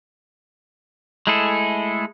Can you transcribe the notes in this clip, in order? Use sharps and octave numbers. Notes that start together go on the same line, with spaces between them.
G#3 A3 E4 G#4 A4